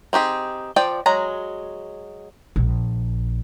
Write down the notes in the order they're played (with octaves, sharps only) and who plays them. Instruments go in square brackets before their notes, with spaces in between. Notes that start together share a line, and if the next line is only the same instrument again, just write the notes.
[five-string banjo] C4 D#4 G4 G#4
F3 D5 G5
F#3 G#3 A#5
[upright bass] A#1